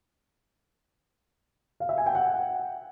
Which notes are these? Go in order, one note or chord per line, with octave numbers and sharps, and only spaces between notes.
F5
E5
G#5
G5
F#5